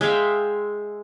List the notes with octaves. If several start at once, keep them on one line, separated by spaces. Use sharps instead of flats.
G#3 E5 F5 G5